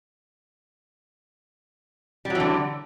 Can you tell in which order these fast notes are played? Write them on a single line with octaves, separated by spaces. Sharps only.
G3 F#3 E3 D3